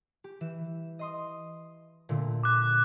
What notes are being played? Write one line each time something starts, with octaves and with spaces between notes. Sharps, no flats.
G4
E3 E7
D#5 C6 D#6
A#2 D3 A3
D6 F#6